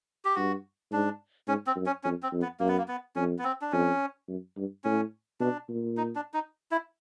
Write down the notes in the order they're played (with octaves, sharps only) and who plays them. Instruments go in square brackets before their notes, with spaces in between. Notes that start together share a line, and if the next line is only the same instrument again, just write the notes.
[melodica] G4
[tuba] G2 [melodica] F#4
[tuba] G#2 [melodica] D4
[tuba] G#2 [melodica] C#4
[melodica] C4
[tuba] F#2
[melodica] C#4
[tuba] F2 [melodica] C#4
[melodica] C4
[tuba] F2
[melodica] B3
[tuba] F#2 [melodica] A#3
[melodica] B3
A#3
B3
[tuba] F2 [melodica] C#4
[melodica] B3
C4
D4
[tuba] F2 [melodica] C#4
[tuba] F#2
G2
[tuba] A2 [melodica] C#4
[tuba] B2 [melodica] D4
[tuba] A#2
[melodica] D#4
D4
D#4
E4